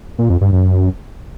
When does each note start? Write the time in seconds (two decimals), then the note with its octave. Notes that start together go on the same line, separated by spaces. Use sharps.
0.18 A#2
0.30 F2
0.41 G2
0.52 F#2